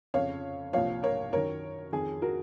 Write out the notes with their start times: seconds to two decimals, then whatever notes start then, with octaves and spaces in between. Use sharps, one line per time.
0.14 F2 C#3 F3 C#5 F5
0.73 C2 A#2 F3 C#5 F5
1.03 A#4 C#5
1.33 F#2 D#3 A#4 C#5
1.92 F2 D#3 G#4
2.22 F#4 A#4